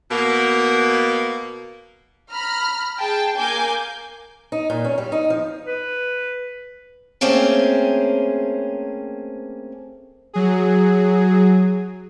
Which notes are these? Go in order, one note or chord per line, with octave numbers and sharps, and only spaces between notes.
B2 A#3
A#5 B5 F6
G#4 G5 A5
A#3 G#5 D6 G6
D#4
A#2
C#4
G3
D#4
F3
B4
A3 A#3 C4 C#4 G#4
F#3 G#4